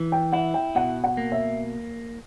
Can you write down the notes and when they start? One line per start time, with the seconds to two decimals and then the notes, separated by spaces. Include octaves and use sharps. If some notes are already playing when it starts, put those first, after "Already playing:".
Already playing: E3
0.12 G5
0.33 E4 F#5
0.54 G5
0.75 B2 F#5
1.04 F#5
1.17 A#3
1.32 E5